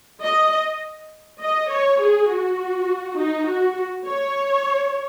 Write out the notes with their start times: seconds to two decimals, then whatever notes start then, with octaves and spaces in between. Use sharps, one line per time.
0.23 D#5
1.41 D#5
1.71 C#5
2.00 G#4
2.29 F#4
3.17 D#4
3.47 F#4
4.06 C#5